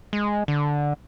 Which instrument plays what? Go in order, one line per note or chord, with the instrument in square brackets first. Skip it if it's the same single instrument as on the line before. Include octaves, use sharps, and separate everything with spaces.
[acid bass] G#3
D3